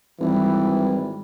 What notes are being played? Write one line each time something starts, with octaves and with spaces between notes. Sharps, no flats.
G#1 E3 G3